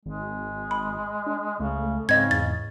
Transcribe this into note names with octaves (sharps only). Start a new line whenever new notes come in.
G#1 G#3
B5
D4
C#2 C#3 A3
G#2 C#3 C4 D#5 G#6
E2 A6